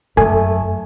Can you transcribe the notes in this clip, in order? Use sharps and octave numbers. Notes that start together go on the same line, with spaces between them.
F#2 A3 A4 G#5